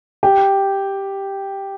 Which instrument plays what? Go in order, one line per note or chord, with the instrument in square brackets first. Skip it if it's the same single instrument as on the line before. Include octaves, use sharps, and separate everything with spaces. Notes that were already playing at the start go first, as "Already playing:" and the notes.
[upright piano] G4